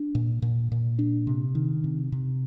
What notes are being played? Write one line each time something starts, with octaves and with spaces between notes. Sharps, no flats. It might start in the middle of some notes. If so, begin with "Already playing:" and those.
Already playing: D4
A#2
A#2
A#2
D4
C3
D#3
C3
C3